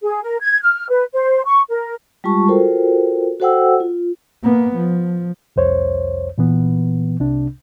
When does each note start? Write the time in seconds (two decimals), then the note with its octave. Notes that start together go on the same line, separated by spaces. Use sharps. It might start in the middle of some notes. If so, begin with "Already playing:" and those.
0.02 G#4
0.23 A#4
0.42 G#6
0.63 F6
0.88 B4
1.13 C5
1.46 C#6
1.70 A#4
2.24 G3 G#3 F4 G4 A5 C#6
2.48 F4 F#4 A4 A#4 C5 G5
3.40 F#4 A4 C5 F#5 G5 E6
3.80 F4
4.43 A#3 B3
4.76 F3
5.56 C2 F2 C5 C#5
6.38 A#2 E3 B3
7.20 C2 C3 D4